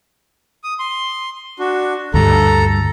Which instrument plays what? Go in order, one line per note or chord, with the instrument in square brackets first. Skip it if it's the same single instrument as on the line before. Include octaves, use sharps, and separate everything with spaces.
[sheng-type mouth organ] D#6
C6
D4 F#4
[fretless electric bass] D2 G2 [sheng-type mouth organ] A4 A#5